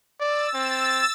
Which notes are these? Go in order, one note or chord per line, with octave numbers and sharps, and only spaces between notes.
D5 E6 A6
C4